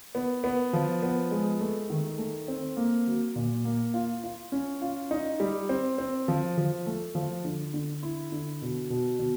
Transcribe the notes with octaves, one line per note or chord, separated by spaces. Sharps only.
B3
B3
F3
B3
G#3
A3
D#3
A3
C4
A#3
F#3
A#2
A#3
F4
F4
C#4
F4
D#4
G3
C4
C4
F3
F3
A3
F3
D3
D3
E4
D3
B2
B2
B2